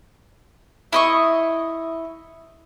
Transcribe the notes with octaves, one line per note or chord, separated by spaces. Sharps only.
E4 D#5 C#6